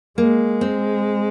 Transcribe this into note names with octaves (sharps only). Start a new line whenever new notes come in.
G#3 A#3
C4